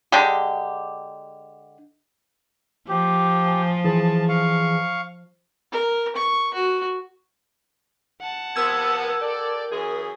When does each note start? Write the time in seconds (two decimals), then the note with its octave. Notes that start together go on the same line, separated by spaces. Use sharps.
0.12 D3 G#3 G4
2.89 F3 G4
3.47 G#5
3.84 E3 G#4 A5
4.29 F5 C#6
5.72 A#4
6.16 C#6
6.54 F#4
8.21 F#5 A5
8.56 C3 F3 B3 A#4 E6 G#6
9.21 G4 A4 D5
9.71 F#2 E3 G#4